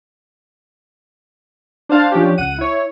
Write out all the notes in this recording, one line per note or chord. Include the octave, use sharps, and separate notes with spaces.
D4 C5 F5 A5
F3 C#4 D4 G4
C#2 F#5 D#7
E4 C#5